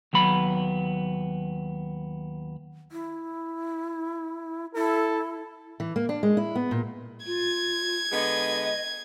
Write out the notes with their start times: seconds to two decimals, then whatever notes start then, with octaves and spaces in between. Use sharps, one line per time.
0.13 D#2 F#3 B3 B5
2.92 E4
4.75 E4 A4
5.80 E3
5.96 A#3
6.09 D4
6.23 G#3
6.37 E4
6.55 B3
6.71 A#2
7.26 F4 G#6
8.12 D3 G#3 B3 D#5